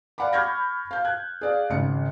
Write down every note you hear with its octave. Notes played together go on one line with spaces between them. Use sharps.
D5 F5 F#5 G#5 B5 D6
B5 C#6 F6 G6 G#6 A#6
F5 G6
F#6 G#6
G#4 D5 F5
G#1 C#3 C#7